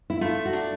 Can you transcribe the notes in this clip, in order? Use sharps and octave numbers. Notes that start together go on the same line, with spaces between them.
E4
A3 F4
F#4
D4